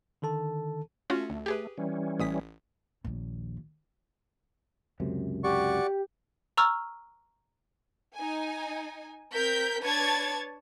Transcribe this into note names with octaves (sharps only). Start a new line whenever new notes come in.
D3 D#3 A4 A5
A3 C#4 F4 F#4
D2
G4 G#4 B4
E3 G3 C#4
A1 D#6 B6
A#1 D#2
C#2 F#2 C3
F#4 G4 D5 C#6
A#5 C#6 E6 F6
D#4 G#5
C4 A#4 G6 B6
D4 B4 C#5 A5 G#6 A6